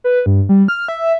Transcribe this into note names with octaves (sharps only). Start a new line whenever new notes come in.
B4
G2
G3
F6
E5